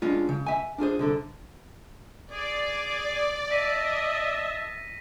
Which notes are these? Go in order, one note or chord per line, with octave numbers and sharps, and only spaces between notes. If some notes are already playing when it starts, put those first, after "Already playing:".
G#3 C#4 D4 F4
C#3
E5 G#5
D4 F4 G#4 C5
C2 D3 A4
G#4 D5
D#5 E5 A5 A#6 B6 D#7